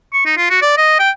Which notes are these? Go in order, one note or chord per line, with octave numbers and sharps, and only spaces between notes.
C#6
D#4
F4
F#4
D5
D#5
G5